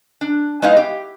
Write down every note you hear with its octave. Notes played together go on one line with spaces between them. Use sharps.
D4
G#3 B3 D#4 E4 F5
G4